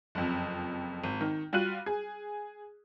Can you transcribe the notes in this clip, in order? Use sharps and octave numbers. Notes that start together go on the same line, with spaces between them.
F#1 F2
G#1
D#3
G3 F4 F#4 F#6 D#7
G#4